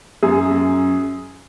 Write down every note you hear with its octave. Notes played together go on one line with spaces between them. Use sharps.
F#2 G#4
F#2